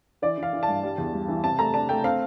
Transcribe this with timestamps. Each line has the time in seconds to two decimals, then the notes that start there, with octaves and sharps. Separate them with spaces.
0.22 E3 D5
0.38 E3
0.43 F5
0.53 E3
0.63 A5
0.68 G2
0.83 G3
0.98 E2
1.14 G3
1.28 E3
1.43 C3 A5
1.59 A3 A#5
1.74 D4 A5
1.89 A3 G5
2.04 C4 F5